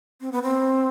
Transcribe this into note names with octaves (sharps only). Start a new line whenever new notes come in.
C4
B3
C4